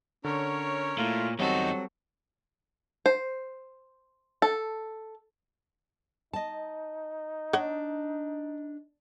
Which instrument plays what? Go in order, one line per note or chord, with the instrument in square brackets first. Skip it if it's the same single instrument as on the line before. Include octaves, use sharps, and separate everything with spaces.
[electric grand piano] D3 [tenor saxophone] C#4 [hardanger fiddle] A#4 C#5
[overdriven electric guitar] A#2 [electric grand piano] A3 E4 [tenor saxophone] F4
[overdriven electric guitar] E2 D#4 [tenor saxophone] F#3 [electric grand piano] G3 C4 [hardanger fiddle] F#4 A4
[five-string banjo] C5
A4
[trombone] D#4 [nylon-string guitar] D#5 A5
[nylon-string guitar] D4 [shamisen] C#5 D#5 F#5